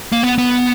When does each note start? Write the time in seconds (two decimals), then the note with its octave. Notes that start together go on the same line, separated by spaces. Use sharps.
0.12 A#3
0.23 B3
0.38 B3